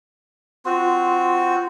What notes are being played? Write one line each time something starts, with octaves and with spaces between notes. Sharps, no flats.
C4 F4 F#4